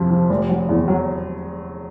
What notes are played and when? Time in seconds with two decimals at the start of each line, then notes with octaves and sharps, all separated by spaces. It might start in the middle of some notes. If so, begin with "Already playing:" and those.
Already playing: F2 C3 F3
0.11 F3
0.30 F1
0.50 F#3
0.69 E2
0.88 F#3